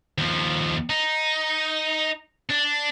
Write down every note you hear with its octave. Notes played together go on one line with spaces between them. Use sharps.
D#2 F3
D#4
D4